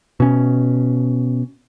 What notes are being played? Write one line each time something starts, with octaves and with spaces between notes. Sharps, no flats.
B2 C#4